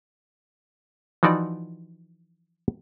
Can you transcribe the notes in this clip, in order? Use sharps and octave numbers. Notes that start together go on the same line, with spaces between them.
E3 F3 D#4 F#4 D5